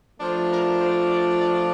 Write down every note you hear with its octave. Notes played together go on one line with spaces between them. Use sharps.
F3 A3 D4 F4 C5
A#4
C5
D5
D5